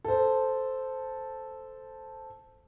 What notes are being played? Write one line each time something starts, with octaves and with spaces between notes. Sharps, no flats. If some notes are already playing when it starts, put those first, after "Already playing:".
A4 C5